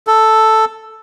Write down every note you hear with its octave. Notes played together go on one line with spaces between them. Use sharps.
A4